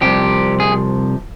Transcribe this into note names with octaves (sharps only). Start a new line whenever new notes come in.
C2 C3 F3 G4
G#4